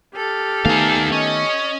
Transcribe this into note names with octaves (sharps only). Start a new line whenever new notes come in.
G4 A4 F6
D#3 A3 B3 D#4 F5 G#5
C#4 D#5